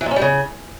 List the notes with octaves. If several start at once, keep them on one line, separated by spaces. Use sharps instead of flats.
E3
A#2
C#4
G3
C#3